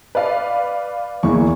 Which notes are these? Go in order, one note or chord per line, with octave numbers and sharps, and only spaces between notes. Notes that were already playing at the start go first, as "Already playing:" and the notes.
B4 D5 F5
E2 E3 A#3 C#6